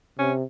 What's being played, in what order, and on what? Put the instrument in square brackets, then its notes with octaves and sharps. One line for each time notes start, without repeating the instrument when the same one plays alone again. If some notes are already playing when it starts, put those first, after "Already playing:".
[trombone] C3 [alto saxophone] C#4